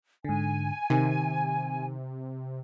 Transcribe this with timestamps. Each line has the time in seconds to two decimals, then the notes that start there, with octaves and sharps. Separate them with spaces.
0.25 G#2 D3 G#5
0.90 C3 D#3